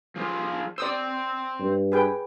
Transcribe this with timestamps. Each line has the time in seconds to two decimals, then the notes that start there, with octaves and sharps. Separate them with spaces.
0.16 F3 G#4 C5
0.78 C5 D5 G5 D#6 E6
1.59 G2
1.92 G#4 B4 G5